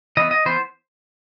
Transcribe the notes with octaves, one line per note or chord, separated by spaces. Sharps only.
E3 B3 D#5
D#5
E3 B3 C5